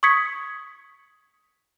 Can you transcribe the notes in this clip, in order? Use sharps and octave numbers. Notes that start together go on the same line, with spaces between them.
C#6 D#6 G#6 B6 C#7